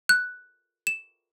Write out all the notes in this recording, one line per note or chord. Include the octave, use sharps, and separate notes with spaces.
F#6
E7